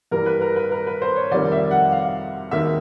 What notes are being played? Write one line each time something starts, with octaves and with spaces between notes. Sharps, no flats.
G2 E3 G3 A#3 A#4
B4
A#4
B4
A#4
B4
C5
C#5
F2 C3 D#3 G3 A#3 D5
E5
F#5
F5
E1 D#2 D#3 E5